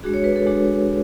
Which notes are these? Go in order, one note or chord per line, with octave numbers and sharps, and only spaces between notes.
G#3 D4 F#4 G#4
C#5
B4
A4
G#3 D4 F#4